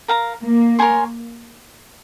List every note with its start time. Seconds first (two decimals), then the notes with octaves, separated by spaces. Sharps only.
0.08 A#4 F5 A#5
0.43 A#3
0.79 A#4 C#5 G#5 C6